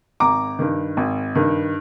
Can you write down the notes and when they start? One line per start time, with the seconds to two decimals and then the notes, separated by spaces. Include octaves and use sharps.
0.20 G#1 A#5 D6
0.59 G2 D#3
0.97 G#1
1.35 G2 D#3